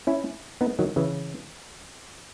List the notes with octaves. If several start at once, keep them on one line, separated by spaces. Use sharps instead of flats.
C#4 E4
B3 D#4
D#3 F#3
C#3 E3